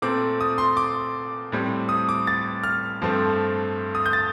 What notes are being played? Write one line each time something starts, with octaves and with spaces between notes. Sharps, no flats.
A#2 A3 C4 D6
D#6
C6
D6
A2 G3 C4
D#6
D6
A6
F6
G2 F3 A3 C4
D#6
G6
A6